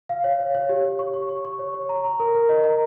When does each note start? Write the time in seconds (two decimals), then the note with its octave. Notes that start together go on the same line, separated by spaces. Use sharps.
0.09 F5
0.24 C#5
0.40 C#5
0.55 C#5
0.69 G4
0.85 C#5
0.99 C#6
1.14 C#6
1.29 C#6
1.45 C#6
1.59 C#5
1.74 C#5
1.89 A#5
2.05 A#5
2.20 A#4
2.34 A#4
2.49 D#5
2.64 A#5